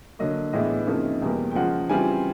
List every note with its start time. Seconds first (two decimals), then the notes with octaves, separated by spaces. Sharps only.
0.19 D3 F#3 A#3 D#5
0.53 A2 E3 G#3 B3 D4 D#5
0.87 F2 C#3 F3 A#3 D#4
1.22 E2 B2 G3 A#3
1.51 G5
1.55 C#3 F3 G#3 F#5
1.89 C#3 E3 G3 C4 F4 G#5